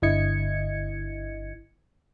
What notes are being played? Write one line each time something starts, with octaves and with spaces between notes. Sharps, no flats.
G1 D3 E4 D#5 G#6 C#7